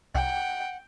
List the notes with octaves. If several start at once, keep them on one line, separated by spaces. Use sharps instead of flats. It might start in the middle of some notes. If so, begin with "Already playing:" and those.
C2 F#5 G5